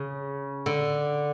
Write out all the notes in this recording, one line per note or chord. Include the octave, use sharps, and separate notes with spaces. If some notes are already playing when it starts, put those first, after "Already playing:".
Already playing: C#3
D3